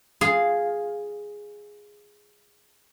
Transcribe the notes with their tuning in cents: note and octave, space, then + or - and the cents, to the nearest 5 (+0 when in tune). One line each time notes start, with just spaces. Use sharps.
F4 +0 G#4 +0